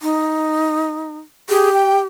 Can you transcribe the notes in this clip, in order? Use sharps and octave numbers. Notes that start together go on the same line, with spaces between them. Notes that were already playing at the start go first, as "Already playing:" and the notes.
D#4
G4 G#4
G5